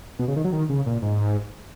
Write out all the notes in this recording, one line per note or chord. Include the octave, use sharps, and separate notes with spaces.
B2
C#3
D#3
F#3
D#3
C#3
A#2
G#2